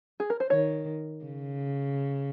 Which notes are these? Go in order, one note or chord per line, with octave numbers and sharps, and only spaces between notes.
G#4
A#4
C5
D#3 C#5
C#3